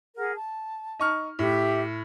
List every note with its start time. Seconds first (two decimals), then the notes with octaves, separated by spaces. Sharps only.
0.17 G#4 A#4 F#5
0.34 A5
0.99 D#4 C#6 F6
1.39 A2 G4 E5